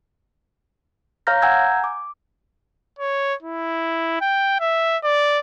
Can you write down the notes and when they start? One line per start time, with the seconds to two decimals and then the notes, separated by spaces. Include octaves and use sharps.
1.27 C#5 F5 A#5 F6 G6 A#6
1.42 F#5 G#5 A#5 E6 G6 G#6
1.84 D6
2.99 C#5
3.42 E4
4.21 G5
4.61 E5
5.04 D5